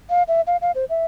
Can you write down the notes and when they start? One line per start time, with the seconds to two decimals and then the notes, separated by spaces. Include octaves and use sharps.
0.10 F5
0.28 E5
0.47 F5
0.62 F5
0.75 C5
0.90 E5